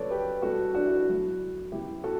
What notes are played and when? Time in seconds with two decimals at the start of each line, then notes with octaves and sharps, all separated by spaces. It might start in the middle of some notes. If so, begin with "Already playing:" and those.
Already playing: C#3 F#3 A3 A4 B4 C#5 D5
0.10 G4 B4
0.42 B2 G3 B3 F#4 A4
0.74 D4 F#4
0.86 E4
0.97 D4
1.07 D3 F#3 A3 E4
1.71 C#3 F#3 B3 E4 G4
2.04 F#4 A4